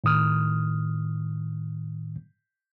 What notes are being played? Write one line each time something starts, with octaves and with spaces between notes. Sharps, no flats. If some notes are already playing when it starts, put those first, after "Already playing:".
A2 D#3 D#6 F6